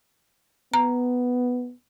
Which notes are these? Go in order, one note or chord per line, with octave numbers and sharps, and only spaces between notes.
B3 A#5